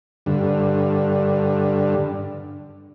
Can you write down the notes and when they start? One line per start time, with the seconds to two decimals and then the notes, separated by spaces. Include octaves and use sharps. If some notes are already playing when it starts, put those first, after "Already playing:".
0.26 G2 D3